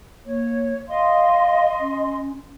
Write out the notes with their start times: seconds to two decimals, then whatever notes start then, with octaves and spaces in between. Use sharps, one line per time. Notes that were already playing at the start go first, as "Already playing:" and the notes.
0.25 A#3 C#5
0.88 D#5 F5 C6
1.80 C#4